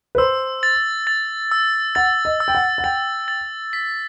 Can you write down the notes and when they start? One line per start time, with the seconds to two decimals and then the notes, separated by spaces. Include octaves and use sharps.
0.15 B4
0.18 C5 E6
0.63 A6
1.07 A6
1.51 E6
1.95 F#5 A6
2.25 D#5
2.40 E6
2.48 G5
2.55 F#5
2.78 F#5
2.84 G5 A6
3.28 A6
3.73 B6